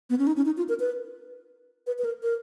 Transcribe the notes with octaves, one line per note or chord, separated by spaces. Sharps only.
B3
C#4
D#4
C#4
D#4
F4
A#4
B4
B4
B4
A#4
A#4